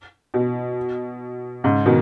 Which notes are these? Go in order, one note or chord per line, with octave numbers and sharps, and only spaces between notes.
B2
G#2 C#3
B2 D#3